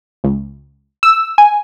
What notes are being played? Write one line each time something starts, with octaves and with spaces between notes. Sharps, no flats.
C#2
E6
G#5